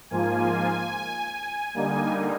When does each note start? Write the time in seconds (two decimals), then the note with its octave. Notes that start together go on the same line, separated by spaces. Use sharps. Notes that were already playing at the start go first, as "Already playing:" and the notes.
0.10 G#2 F3 A#3 F4 G#5
1.74 D3 G3 A#3 D#4 G#5